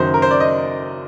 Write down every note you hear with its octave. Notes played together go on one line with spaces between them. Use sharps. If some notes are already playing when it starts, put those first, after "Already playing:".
Already playing: F#1 F#2 D#3 F#3 C5
A#4
C5
D5
D#5